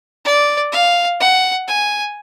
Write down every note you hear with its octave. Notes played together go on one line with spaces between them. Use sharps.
D5
F5
F#5
G#5